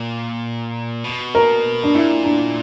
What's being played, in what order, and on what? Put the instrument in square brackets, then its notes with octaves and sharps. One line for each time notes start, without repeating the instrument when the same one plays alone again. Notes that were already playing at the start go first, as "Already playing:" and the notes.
Already playing: [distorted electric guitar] A#2
B2
[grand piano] A#4
D4
[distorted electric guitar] A#2 [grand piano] E4
[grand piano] D4